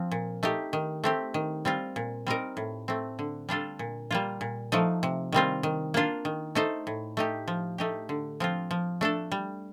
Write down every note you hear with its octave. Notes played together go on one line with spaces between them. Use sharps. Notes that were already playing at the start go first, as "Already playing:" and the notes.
Already playing: F3 C4
A#2
A3 D#4 G4
D#3
A3 C4 G4
D#3
G3 C4 F4
A#2
G3 C4 D#4 A#4
A2
A3 C4
D3
G3 D4 F4 A4
A#2
G3 A#3 F4
A#2
F3 A3 D#4
C3
D#3 G3 C4 F4
D#3
A#3 D4 F4
D#3
A3 D#4 A4 C5
A2
A3 D#4 G4
F3
A3 D#4 G4
D3
F3 C4 F4
F3
A3 D4 A4
G3